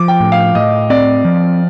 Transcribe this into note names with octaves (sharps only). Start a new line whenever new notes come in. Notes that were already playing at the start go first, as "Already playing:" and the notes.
Already playing: F3 D6
G5
A2
F5
A2 D#5
C4 D5
F3